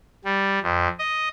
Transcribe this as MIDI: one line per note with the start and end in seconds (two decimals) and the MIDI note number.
0.25 0.59 55
0.62 0.88 41
0.99 1.29 75